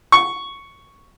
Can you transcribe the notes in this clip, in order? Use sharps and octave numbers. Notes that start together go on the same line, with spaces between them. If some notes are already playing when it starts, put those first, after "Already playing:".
C#6